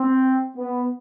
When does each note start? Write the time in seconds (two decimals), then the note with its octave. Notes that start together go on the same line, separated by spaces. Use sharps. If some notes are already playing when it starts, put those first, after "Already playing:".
Already playing: C4
0.56 B3